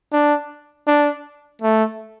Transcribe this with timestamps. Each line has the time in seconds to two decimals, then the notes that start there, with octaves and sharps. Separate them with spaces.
0.13 D4
0.87 D4
1.61 A3